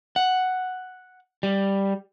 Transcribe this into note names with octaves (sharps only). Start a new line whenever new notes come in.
F#5
G3